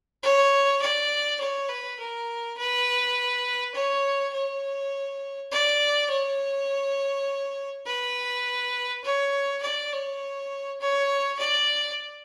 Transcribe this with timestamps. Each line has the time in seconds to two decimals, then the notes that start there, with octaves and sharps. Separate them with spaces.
0.23 C#5
0.81 D5
1.40 C#5
1.69 B4
1.99 A#4
2.58 B4
3.75 C#5
4.33 C#5
5.51 D5
6.10 C#5
7.86 B4
9.03 C#5
9.62 D5
9.92 C#5
10.80 C#5
11.39 D5